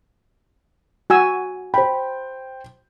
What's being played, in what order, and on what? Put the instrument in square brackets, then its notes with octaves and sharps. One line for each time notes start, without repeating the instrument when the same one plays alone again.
[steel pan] F#4 G#5 E6
[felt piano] C5 G5 [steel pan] B5